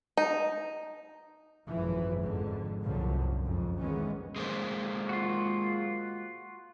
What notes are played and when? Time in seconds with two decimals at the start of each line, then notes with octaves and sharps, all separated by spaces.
0.17 D#4
1.69 G#1 F#2 B2 E3 F3
2.20 F2 G#2 D3
2.83 C2 F#2 A#2 D3 F3
3.44 F2 G#2 C#3
3.79 D#3 E3 G#3 B3 C#4
4.36 G#3 A#3 C5
5.09 F4 F#4